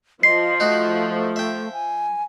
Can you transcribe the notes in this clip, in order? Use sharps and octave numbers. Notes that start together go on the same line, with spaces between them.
F3 D#5 C6 C7
A3 D#4 F#4
E5 G5
G#5